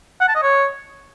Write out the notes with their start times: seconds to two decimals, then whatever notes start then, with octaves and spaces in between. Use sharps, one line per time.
0.21 F#5
0.28 A5
0.35 D#5
0.43 C#5